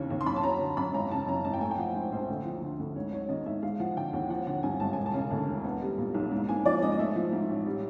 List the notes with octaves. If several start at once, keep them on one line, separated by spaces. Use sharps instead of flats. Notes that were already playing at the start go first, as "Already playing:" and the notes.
Already playing: D#2 C#3 E3
D#2
C6
F#2 B5
A5
F#3 A#5
D3
F#2 B5
G#1 A#5
C#3 A5
F#2 A#5
G#1 A5
G5
A3 G#5
G5
F3 F#5
G#2 C5
A#1 C5
D2
F3
D3
D2
G#2 C#5
F#3 C#5
D#3 D#5
G#2 E5
G#3 F5
F3 F#5
D3 G5
D#2 F#5
F3 F#5
D3 F#5
G2 G#5
G#1 A5
E1 G#5
A5
C#3
D2
E1
B3
G3
A#2
B1
G#2
A#3 G#5
F3 D5
G#2 D#5
D#5
A3 E5
F3
G#2
A1
G3